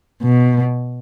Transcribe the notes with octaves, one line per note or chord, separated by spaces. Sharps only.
B2